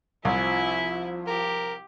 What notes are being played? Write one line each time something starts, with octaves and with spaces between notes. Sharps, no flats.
C2 F3 E4 E5 G#5
G4 A#4